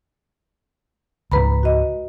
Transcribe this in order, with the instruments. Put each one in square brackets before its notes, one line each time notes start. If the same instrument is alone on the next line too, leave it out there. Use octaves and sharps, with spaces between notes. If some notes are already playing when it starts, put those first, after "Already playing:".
[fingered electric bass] C#2 G#2 [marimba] B4 A#5 B5
[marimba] F#4 D#5